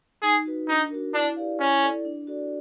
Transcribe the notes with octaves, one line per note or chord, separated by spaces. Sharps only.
D#4 G#4
F#4 B4
D4 D#4
F#4 A#4
D4 E4
G4 B4 D5 F5
C#4 E4
A4 D5
D4
F#4 A4 D5